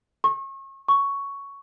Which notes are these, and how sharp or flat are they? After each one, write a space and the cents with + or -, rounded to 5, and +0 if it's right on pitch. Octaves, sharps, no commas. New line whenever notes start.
C#6 -35
C#6 +10